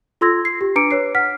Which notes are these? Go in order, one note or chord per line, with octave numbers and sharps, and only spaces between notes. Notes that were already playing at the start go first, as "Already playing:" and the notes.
F4 A4 C6 E6 G#6 A#6
C7
G4
D4 B4 A#5 D6 C#7 D7
B4 C#5 C7
F#5 F6 B6